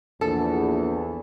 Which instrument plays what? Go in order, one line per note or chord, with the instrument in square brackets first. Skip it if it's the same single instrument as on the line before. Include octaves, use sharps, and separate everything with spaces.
[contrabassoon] A#1 [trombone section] E2 [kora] A4